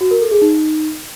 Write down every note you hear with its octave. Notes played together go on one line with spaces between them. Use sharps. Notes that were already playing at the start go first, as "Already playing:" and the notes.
F#4
A#4
A4
G#4
D#4